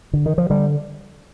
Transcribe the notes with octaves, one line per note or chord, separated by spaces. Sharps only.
D3
D#3
F3
D3 G3